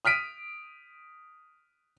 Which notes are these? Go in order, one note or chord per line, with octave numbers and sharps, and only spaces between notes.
D#6 F6 B6 D7 D#7